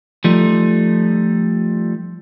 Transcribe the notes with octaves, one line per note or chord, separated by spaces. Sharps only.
F3 G3 A3 D#4